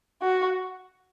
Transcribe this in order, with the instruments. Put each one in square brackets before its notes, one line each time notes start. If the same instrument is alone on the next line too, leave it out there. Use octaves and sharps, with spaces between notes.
[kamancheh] F#4